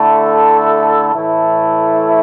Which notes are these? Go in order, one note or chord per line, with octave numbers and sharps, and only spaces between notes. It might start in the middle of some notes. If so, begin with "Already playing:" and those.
Already playing: D3 A3 E4 A4
A2 E3 A3 E4 A4